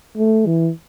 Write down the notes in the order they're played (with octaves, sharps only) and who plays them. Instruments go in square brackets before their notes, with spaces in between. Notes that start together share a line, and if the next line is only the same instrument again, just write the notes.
[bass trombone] A3
E3